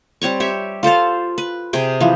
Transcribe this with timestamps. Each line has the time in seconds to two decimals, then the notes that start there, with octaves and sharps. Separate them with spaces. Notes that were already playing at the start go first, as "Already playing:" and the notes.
0.22 G3 C4 C#5 C#6
0.40 G4 C#5 E5
0.83 F4 A4 C5 F5
1.38 B4
1.73 C3 G#4 G5
2.00 E3 F3